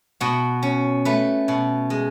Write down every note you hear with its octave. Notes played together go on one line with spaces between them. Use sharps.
B2 F#4
C#4
A3 B4
B2
G#3